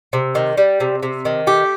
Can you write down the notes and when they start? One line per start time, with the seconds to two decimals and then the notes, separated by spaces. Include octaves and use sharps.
0.13 C3
0.35 D#3
0.57 G3
0.80 C3
1.03 C3
1.25 D#3
1.47 A3 G4